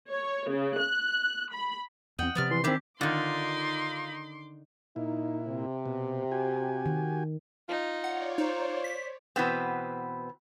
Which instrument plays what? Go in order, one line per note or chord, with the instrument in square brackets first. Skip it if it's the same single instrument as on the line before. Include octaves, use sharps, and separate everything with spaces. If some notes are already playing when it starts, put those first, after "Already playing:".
[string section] C#5
C#3
F#6
B5
[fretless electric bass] E2 C4 [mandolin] D#5 F#5 G5
[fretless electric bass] C3 F3 [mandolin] B3 D5 F6
[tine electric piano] E3 [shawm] C6
[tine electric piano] D#3 C4 [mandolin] D4 E4 G#4 [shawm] G4
[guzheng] D3 D#3 [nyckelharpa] D#4 [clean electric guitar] F4 D5 [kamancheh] C6 D6
[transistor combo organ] A#2 E4 [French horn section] D#4
[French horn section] C3
[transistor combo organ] B2
F#4 G4 G#5
[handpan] D#3
[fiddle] D#4 [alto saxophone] F4
[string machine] C#5 D5 [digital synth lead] F#5
[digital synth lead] D#4 [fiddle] C5
[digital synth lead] B6
[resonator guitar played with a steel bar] B2 E3 B3 C4